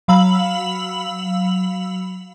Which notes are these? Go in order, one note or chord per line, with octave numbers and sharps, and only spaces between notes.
F#3 F5 B5 E6 F#7